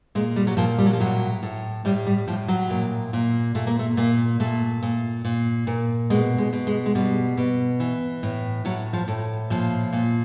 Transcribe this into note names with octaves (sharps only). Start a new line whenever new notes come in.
A#2 G#3
G3
F#3
A#2 F3
G3
F#3
F3
A2 F#3
A2
A2 G3
G3
A2 F3
F#3
A#2
A#2
A#2 A3
A#3
A3
A#2 A#3
A#2 A3
A#2
A#2
A#2
B2 G#3
G#3
B2
G#3
G#3
B2 G3
B2
E3
A2
A2 F#3
F3
A2
A#2 F3
A#2